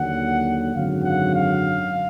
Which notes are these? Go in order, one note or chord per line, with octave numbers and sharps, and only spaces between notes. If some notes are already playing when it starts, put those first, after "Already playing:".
Already playing: D#2 D3 F#3 F#5
G#1 F#2 D3 F#3 F5
F#5
F5